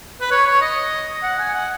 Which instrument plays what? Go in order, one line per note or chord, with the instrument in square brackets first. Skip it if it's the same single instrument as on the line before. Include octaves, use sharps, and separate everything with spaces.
[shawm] B4
C#5
C#5
D#5
F#5
G#5
F#5